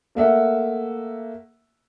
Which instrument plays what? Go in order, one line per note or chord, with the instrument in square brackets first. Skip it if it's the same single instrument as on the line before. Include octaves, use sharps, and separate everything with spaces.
[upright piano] A3 A#3 E5 F#5